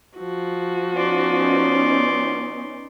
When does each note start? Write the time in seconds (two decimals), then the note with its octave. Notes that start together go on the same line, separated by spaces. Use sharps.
0.17 F3 F#4
0.95 B3 C#4 D#4 D5 C6